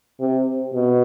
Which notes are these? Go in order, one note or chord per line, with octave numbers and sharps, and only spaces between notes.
C3
B2